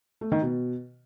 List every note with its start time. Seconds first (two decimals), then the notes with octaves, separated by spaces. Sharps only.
0.21 A3
0.32 D#3
0.42 B2